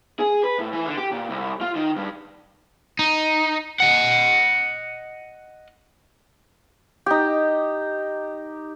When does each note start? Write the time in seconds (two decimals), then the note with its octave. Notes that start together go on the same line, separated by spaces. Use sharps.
0.19 G#4
0.43 B4
0.58 A2
0.73 E3
0.86 D3
0.98 G4
1.12 A#2
1.30 C2
1.61 F4
1.75 D#3
1.96 G2
2.99 D#4
3.80 D#5 F#5
7.06 D#4 G4